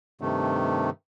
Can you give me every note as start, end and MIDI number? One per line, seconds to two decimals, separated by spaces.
0.21 0.90 43
0.21 0.90 48
0.21 0.90 51
0.21 0.90 57